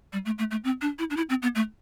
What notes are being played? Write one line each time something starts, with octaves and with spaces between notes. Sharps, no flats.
G3
A3
A3
A3
C4
D4
E4
D4
E4
C4
B3
A3